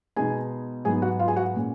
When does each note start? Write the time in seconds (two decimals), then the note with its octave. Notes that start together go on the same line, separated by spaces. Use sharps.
0.16 B2 G#3 B3 D#4 G#4 G#5
0.85 G#2 F#3 B3 D#4 G#4 G#5
1.02 F#4 F#5
1.19 F4 F5
1.28 G#4 G#5
1.36 F#4 F#5
1.54 A#2 G#3 C#4